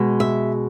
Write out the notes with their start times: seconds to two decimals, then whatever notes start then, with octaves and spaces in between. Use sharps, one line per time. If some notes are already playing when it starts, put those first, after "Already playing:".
Already playing: B2 G#3
0.20 E5